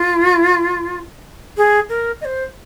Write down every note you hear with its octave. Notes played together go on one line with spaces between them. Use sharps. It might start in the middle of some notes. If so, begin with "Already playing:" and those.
Already playing: F4
G#4
A#4
D#5
C5